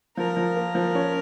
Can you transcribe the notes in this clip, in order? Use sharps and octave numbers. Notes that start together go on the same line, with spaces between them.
F3 A#4
F3
A#3
F3
C#4